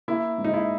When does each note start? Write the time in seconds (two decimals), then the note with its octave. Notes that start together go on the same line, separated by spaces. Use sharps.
0.08 A#3 E4
0.38 G#2
0.44 D#4
0.54 E4